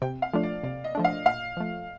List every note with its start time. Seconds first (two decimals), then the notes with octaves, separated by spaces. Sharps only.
0.02 C3 G5
0.22 F5
0.33 F3 A3 D4
0.43 D5
0.64 C3 D5
0.84 D#5
0.95 F3 A3 D4
1.04 F5
1.26 A#2 F5
1.57 F3 A3